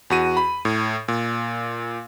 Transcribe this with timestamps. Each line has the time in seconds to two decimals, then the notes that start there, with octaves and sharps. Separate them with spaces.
0.10 E2 F#4 D#7
0.37 B5
0.65 A2
1.08 A#2